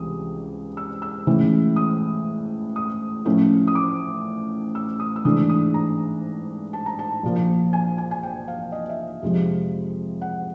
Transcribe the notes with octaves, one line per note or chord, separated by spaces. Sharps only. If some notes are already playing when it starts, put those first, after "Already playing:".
Already playing: C#2 C3 E3 G3 D#6
E6
E6
A2 E3 G#3 C#4 E4
D#6
D#6
A2 F3 A3 C#4 E4
D#6
D6
E6
D#6
E6
G#2 E3 A3 D4 D#6
D#6
A#5
A5
A#5
A5
A#1 A#2 F3 A#3
G#5
G#5
G#5
G5
F5
D#5
E5
F2 C3 F3 G#3
F#5